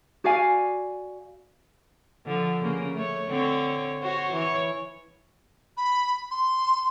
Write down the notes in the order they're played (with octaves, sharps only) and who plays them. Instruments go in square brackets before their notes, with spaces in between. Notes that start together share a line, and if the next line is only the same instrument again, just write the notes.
[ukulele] F#4 D5 F5 G#5
[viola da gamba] D3 F3
C#3 A#3
A3 C#5
D3 C4 C#5
F#4 C5 C#5
E3 C#5
[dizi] B5
C6